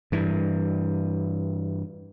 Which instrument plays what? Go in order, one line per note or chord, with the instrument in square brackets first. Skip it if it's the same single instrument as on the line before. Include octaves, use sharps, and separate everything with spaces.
[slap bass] G2 E3